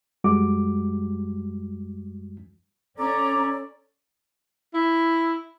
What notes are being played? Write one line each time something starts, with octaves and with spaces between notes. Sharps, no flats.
F#2 G3 G#3 F#4 D6
C#4 A4 D5 A#5
E4